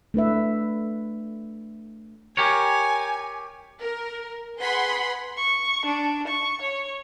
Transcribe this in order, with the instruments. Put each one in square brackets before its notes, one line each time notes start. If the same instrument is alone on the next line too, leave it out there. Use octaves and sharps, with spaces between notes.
[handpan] A3 D4 B4 E5
[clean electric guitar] G4 A#4 C#5 [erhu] G#5
[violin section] A#4
G#4 B4 F#5 B5 C6
[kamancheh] C#6
D4
C#6
C#5